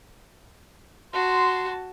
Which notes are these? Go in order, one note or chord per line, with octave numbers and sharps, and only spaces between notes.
F#4 A5 C6